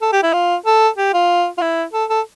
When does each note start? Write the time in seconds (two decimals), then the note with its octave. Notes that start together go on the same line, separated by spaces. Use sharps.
0.02 A4
0.13 G4
0.23 E4
0.33 F4
0.66 A4
0.98 G4
1.14 F4
1.58 F4
1.61 E4
1.94 A4
2.10 A4